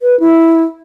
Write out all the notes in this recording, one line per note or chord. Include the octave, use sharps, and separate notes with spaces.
B4
E4